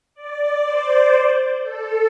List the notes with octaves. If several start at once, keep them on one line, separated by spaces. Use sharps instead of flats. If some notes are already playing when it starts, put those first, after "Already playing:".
D5
C5
A4